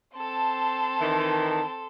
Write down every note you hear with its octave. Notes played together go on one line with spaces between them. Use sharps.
C4 A4 A5 C6
D#3 E3